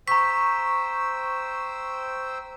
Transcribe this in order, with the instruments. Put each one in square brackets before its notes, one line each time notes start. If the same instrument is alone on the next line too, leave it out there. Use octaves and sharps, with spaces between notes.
[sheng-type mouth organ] C5 G5 E6 [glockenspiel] A#5 B6 [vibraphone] C#6